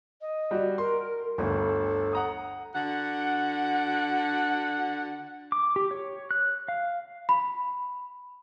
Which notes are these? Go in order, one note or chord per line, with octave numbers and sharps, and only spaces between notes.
D#5
G3 F#4
A#4 C6
G1 D2 A4
F#5 A#5 D#6
D3 F#4 F#5
D6
G4
C#5
F#6
F5
B5